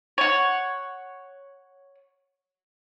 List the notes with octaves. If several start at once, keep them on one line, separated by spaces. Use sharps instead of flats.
C#5 F#5